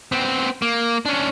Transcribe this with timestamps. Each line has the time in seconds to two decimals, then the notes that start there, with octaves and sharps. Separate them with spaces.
0.12 B3 C4
0.62 A#3
1.06 C#4 D4